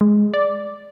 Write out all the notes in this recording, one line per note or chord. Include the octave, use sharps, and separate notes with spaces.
G#3
D5